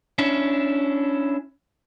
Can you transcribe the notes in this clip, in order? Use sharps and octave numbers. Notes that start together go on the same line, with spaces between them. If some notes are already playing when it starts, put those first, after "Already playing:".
C#4 D4 E4